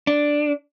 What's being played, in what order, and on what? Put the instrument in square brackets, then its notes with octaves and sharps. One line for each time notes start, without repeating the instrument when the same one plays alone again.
[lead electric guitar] D4